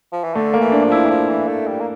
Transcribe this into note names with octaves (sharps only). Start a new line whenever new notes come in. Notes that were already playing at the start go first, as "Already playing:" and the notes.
F3
E3
D3 A3
A#3
E3
D4
F3
E4
E3
F3
E3
A3
G3
A#3